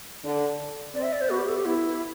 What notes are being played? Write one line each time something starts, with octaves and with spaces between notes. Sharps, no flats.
D3
C4 D5
E5
D5
C5
B3 F#4
G4
A4
G4
B3 E4